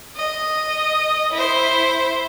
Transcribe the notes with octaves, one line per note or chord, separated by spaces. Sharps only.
D#5
E4 C5